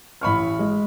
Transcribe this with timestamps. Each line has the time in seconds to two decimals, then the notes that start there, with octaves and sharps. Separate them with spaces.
0.21 A1 B5 C#6 F6
0.59 G#3